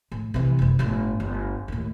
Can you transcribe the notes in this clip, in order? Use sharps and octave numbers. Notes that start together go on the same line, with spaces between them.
A2
C3 E3
F#1 C2
G1 A2
G1
D#2 A2